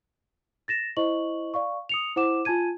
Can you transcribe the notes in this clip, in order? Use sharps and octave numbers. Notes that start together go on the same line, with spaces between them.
A6 A#6 E7
E4 C5 D#5 C#6 F#7
D5 F5 C#6
D#6 C#7 F7
E4 C5 F#5 D6 E7
F4 G#5 A5 G#6 D#7